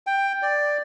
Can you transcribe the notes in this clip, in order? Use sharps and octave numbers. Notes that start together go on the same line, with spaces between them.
G5
D5